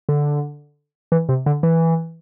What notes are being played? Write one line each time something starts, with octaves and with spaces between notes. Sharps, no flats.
D3
E3
C3
D3
E3